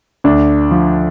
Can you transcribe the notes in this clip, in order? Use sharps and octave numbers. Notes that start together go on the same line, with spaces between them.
D2 D4
F3